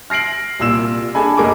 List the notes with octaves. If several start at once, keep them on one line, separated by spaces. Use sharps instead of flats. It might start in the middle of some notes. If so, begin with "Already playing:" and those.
F6 A#6 C7 D7 F#7
C2 A#2 E6 E7
D4 G#4 A4 G#5 B5
F#1 C#2 G#4 A#4 D6